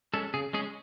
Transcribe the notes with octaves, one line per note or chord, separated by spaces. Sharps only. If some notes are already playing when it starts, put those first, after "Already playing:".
G#3 C#4 A4
C#3 G#4
G#3 C#4 G#4